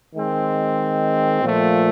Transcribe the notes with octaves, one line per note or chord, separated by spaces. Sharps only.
D#3 G#3 C4
A#2 F3 A3